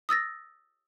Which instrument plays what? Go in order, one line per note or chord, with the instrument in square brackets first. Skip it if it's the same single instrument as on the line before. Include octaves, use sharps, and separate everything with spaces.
[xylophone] D#6 E6 A6 A#6